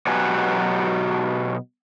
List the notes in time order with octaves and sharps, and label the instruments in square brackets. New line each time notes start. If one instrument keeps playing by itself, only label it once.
[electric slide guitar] B2 F#3 G4 B4 F#5 G#5